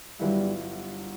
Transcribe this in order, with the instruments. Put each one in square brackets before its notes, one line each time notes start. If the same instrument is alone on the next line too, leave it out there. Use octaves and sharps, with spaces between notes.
[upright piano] G1 G2 F#3 B3 E4 [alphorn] G3